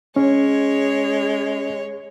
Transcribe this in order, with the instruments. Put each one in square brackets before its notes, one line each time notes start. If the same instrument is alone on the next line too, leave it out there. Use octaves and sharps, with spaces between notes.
[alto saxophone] G#3 [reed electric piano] C#4 [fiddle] C#5